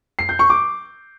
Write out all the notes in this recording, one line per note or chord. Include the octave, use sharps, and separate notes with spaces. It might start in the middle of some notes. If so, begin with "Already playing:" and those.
C7
G6
C#6
D6